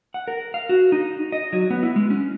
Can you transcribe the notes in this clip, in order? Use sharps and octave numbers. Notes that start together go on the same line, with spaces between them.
F#5
A#4
F5
F#4
D#4
D#5
F#3
B3
E4
G#3
C#4